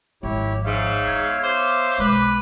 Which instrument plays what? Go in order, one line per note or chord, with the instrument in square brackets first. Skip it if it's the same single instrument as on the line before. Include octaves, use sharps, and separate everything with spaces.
[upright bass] G#1 F3 [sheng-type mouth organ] E4 G4 C#5
[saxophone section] G#2 [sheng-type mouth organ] C#5 E5 F5
[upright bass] B3 [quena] G#6
[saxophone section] C5 [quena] D6
[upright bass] B1 G#3 [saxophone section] B4